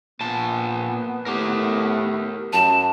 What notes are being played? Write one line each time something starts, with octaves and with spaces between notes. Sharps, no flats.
A#2 B3 A5
A2 G4 A#4
F#2 A5